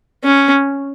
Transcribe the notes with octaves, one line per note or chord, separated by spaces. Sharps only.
C#4